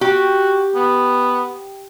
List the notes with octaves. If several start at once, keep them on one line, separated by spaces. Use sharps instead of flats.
F#4 G4
B3